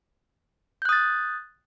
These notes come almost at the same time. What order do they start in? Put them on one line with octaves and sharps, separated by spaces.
G6 F#6 D#6 A6